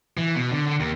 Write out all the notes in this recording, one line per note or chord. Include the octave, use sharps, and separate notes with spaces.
E3
B2
D3
D3
D#2